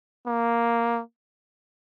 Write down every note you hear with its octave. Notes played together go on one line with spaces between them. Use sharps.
A#3